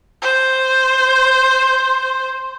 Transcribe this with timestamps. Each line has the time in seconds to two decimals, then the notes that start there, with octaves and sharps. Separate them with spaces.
0.22 C5
0.68 C6